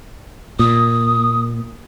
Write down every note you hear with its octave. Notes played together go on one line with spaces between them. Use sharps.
A#2 D#6